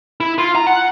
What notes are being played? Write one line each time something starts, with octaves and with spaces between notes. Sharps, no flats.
E4
F4
A#5
F#5